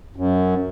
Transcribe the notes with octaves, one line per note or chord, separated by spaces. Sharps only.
F#2